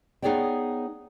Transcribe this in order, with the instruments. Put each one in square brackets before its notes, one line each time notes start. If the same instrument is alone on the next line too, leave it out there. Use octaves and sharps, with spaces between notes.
[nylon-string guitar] B3 D#4 G#4 C#5 D5 G5